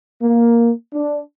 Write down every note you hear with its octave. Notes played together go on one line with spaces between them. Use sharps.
A#3
D4